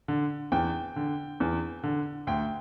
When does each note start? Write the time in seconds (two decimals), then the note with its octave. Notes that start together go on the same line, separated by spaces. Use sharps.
0.08 D3
0.52 E2 G5
0.96 D3
1.40 E2
1.83 D3
2.27 D2 G5